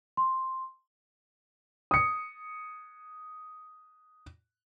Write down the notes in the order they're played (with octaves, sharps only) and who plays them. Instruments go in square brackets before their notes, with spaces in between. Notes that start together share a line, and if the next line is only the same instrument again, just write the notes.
[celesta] C6
[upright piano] D#6 C#7